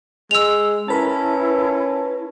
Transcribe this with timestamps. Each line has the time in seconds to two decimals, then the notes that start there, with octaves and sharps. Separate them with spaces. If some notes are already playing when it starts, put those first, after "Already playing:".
0.31 G#3 E6 F7
0.88 C#4 E4 A#4 B4 A5